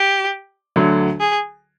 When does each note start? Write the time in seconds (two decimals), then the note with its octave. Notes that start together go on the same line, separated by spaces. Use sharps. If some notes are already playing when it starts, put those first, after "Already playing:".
Already playing: G4
0.76 D2 D3 F#3
1.20 G#4